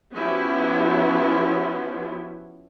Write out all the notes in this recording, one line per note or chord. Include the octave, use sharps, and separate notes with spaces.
F3 B3 C#4 E4 F#4 G4